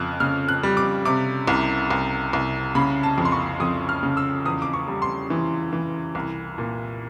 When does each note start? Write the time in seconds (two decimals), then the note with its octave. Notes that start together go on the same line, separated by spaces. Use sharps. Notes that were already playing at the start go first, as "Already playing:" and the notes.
Already playing: F2 C#3 F6 F#6
0.20 C#3 F6
0.49 F#6
0.63 G3
0.77 D6
1.05 C3 D6
1.48 C2
1.91 C2
2.33 C2
2.75 C#3 B5
3.03 A5
3.18 F2
3.25 C6
3.32 C#6
3.60 F2 D#6
3.89 F6
4.03 C#3
4.17 E6
4.45 E2 D#6
4.62 D6
4.74 C#6
4.88 G3
5.02 C6
5.30 E3
5.73 E3
6.15 C2
6.58 A#2